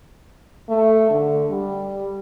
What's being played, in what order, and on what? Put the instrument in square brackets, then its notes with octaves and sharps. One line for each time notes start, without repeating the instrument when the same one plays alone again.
[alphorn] A3
D3
G3